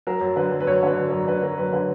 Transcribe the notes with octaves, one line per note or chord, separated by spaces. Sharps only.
F#3 A#4
F#2
D3 B4
F#3
B4
F#2 C#5
D3 B4
F#3
F#2 A#4
D3 B4
F#3 A#4
F#2 B4
D3 B4